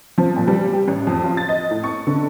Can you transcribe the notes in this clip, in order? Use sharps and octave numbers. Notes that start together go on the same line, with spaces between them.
F3
A#2
G3
G4
A1
F2
F4
A6
D#5
A2
C#6
D3